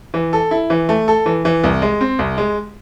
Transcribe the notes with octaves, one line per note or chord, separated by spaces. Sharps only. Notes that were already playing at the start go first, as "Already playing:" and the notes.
E3
A4
E4
E3
A3
A4
E3
E3
C2
G#3
C4
C2
G#3